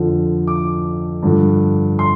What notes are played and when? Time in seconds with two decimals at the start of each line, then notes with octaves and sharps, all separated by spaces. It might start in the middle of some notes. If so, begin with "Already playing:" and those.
Already playing: F2 D3 F3
0.47 D6
1.23 G2 D3 F3
1.99 C6